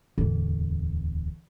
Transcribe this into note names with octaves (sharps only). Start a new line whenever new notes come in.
D1 E2